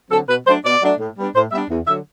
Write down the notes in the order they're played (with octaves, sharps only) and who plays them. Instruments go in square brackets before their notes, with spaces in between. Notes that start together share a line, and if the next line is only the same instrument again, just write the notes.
[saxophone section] D3 F#3 C4 A4
B2 B4
F#3 A3 D4 C5
B2 D5
F#3 A3 D4
A2
G3 B3 D4
A2 C5
G3 B3 D4 E5
E2
D3 F#3 E5